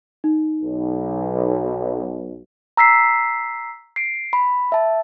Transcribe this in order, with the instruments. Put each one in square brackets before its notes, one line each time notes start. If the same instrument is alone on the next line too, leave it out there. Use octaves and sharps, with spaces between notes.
[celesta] D#4
[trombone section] B1
[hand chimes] A#5 E6 B6 C7
C7 D7
B5
E5 A5